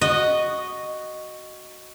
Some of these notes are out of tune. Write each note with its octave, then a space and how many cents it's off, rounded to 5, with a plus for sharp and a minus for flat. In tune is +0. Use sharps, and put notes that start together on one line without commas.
F#4 +0 D#5 -10